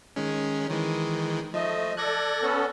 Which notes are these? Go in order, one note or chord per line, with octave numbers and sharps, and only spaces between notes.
D#3 G#3 C#4
D#3 E3 G#3
F3 A3 D#5
A4 D5 F#6 G#6 A#6
B3 C#4 A4